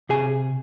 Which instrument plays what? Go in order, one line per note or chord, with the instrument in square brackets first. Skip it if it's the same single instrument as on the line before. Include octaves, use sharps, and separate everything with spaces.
[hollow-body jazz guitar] C3 G#4 G#5